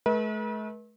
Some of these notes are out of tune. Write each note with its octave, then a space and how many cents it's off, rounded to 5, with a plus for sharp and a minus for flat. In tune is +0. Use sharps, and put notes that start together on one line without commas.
A3 -40 B4 -45 E5 -45